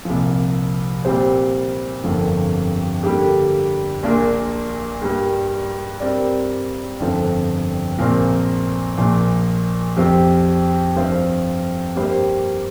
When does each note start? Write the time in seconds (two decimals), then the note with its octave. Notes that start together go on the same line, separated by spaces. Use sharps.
0.05 C2 A#2 F3
1.04 A#2 G3 C4 G4 C5
2.04 G1 F2 D3 F3 A#3
3.03 D3 G3 A#3 G4
4.03 A#1 A#2 A#3 D4 A#4
5.01 G2 G3 A#3
6.00 G2 G3 C4 A#4 D5
6.99 G1 F2 D3 F3 C4
7.99 A#1 A#2 F3 C4 A#4
8.97 A#1 A#2 F3
9.97 F2 F3 C4 G4
10.96 G2 F3 C4 F4 C5
11.95 G2 G3 A#3 G4 C5